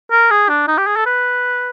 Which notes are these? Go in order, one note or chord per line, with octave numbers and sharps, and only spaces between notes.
A#4
G#4
D4
D#4
G4
G#4
A4
B4